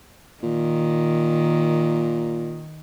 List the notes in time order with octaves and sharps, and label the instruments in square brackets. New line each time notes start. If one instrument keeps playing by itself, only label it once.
[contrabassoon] A#2 [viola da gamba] D#3